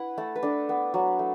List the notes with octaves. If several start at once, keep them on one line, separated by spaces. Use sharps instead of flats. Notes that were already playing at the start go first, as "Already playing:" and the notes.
Already playing: E4 B4 F#5
A3 A4
B4
D4 A4
B3
F#3
A3